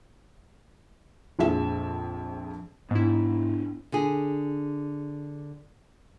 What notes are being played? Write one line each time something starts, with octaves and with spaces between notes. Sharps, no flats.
A#1 F2 G#4 E5 E7
G#2 B3 D4 E4
D3 G#4